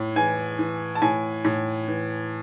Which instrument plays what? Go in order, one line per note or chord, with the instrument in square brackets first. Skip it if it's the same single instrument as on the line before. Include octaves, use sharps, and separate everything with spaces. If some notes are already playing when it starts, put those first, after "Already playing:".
Already playing: [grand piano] A2
E3 G#5
E3
A5
A2 G#5
A2
E3